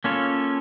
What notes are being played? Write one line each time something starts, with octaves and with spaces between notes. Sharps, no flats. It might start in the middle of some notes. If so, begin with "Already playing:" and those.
A#3 C#4 F4 A4 C#5